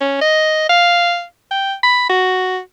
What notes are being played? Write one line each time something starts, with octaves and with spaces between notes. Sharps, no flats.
C#4
D#5
F5
G5
B5
F#4